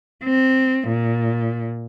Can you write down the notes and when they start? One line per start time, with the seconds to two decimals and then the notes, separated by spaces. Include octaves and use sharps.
0.24 C4
0.88 A#2